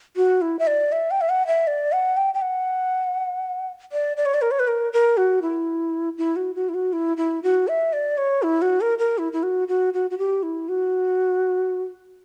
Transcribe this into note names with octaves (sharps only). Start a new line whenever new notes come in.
F#4
E4
E5
D5
E5
G5
E5
F#5
E5
D5
F#5
G5
G5
F#5
D5
D5
C#5
D5
A#4
C#5
B4
A#4
A#4
F#4
E4
E4
F#4
F#4
E4
F#4
E4
E4
F#4
E5
D5
C#5
E4
F#4
A#4
A#4
E4
E4
F#4
F#4
F#4
F#4
G4
E4
F#4